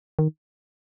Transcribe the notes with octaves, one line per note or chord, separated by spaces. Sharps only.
D#3